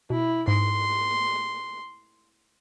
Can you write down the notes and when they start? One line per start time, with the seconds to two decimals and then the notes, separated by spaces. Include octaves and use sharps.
0.10 B2 E4
0.48 G#2 C6